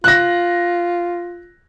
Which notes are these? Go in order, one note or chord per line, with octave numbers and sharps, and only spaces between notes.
F4 F#6 A#6